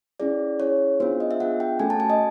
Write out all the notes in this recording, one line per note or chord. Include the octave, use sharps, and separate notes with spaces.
C#4 E4 G#4 D5
C#4 E4 G#4 C#5
B3 D4 F4 G#4 C5
D#5
E5
B3 D4 F4 G#4 F#5
G5
A3 C#4 F#4 A4 G#5
A5
G#5
D#5